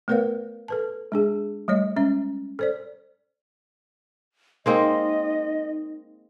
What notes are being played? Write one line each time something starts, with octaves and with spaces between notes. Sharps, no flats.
A3 B3 A#4 B4 C#5 F5
A4 B4 A5
G#3 D4 G#4
G3 A3 C#5 D#5
G#3 C#4 E5
A4 C5 D5
G#3 A#3 C4 D#4 D#5